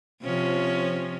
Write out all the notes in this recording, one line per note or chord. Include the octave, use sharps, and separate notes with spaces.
C3 F3 C#4